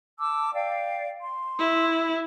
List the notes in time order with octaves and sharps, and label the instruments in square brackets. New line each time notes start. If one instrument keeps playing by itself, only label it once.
[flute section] A5 D6 E6
D5 F5 G5
C6
[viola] E4